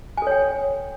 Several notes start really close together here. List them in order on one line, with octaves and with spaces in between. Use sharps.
G#5 A4 C#5 G5